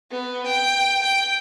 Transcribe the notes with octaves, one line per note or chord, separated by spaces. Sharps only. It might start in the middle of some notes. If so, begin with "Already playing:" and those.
B3
G5
G5